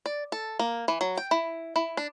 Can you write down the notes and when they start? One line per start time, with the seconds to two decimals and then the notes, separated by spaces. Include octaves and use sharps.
0.06 D5
0.32 A4
0.59 A#3
0.88 E3
1.01 F#3
1.17 G5
1.31 E4
1.76 E4
1.97 D4